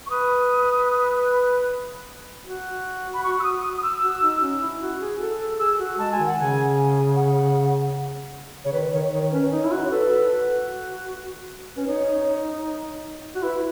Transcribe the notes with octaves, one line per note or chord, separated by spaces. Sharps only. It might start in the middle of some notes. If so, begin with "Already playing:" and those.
C#6
B4 D#6
F#4
B5
C#6
E6
D#6
D#6
D#6
E6
F#4
D#4
C#4
E4
F#4
G#4
A4
A4
G#4 E6
F#4
G#3 A5
G#5
D#3
F#5
C#3 G#5
F#5
C#3 C#5
D#3 B4
D#3 C#5
D#3 C#5
C#4 B4
D#4 C#5
E4
F#4
C#5
A4 B4
A4
F#4
C#4 B4
D#4 C#5
F#4
E4 B4